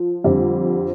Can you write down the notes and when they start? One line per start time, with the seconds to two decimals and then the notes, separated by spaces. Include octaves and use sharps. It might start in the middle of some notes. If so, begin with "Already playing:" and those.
Already playing: F3
0.24 F2 D3 G3 C4